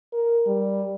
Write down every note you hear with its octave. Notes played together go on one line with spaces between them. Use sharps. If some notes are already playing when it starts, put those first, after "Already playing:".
A#4
G3